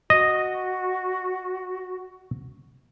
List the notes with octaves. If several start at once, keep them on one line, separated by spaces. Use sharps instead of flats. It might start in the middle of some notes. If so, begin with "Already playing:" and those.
F#4 D#5